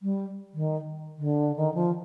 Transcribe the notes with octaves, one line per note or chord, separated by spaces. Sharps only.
G3
D#3
D3
D#3
F3